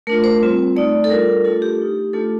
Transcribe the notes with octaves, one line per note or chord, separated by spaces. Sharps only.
A3 D4 F4 A#4
C5
G3 C4 F4
A3 D#4 D5
A4
G3 D4 F4 A#4
A3 D4 F4 A4
G4
A3 D#4
A3 D4 F4 A4